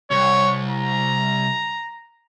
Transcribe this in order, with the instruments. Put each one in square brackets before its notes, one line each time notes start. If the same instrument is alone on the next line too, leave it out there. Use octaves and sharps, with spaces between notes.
[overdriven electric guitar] C2 [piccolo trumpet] C#5
[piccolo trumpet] A#5